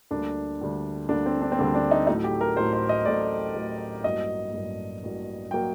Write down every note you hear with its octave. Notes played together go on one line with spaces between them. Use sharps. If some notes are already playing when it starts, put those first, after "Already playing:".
D2 D3 G3 A#3 D4
D2 D3 G3 A#3
D2 D3 G3 A#3 D4
C4
D4
C4
D2 D3 G3 A#3 D4
D4
D#4
A1 A2 F#3 A3 D#4
G4
A#4
A1 A2 F#3 A3 C5
C5
D#5
A1 A2 F#3 A3 D5
A1 A2 F#3 A3
A1 G2 F#3 A#3 D#5
A1 G2 F#3 A#3
A1 G2 F#3 A#3
F#3 A#3 G5